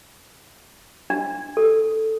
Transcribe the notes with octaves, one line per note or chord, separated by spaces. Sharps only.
D4
A4